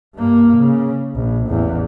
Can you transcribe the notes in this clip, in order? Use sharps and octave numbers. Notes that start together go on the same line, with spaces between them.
G2 A#3
C#3
A#1
A1 E2